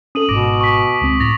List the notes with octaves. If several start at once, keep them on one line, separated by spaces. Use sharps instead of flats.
C#4 A4 D#6 D#7 F#7
G#1 G#2 B2 D6 A#6 D7
C#6 B6
C#2 C4
A2 A6 A#6 F7